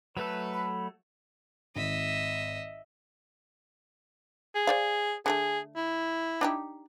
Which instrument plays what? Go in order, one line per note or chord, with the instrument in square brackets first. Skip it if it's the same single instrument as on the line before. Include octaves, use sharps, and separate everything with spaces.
[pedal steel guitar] F#3 A3 A4 [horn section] B4
[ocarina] B5
[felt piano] G#1 [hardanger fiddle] D#5 E5
[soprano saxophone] G#4
[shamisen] C5 D5 F5
[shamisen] D3 F3 A3 [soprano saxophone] G#4
[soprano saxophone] E4
[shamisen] D4 D#4 G4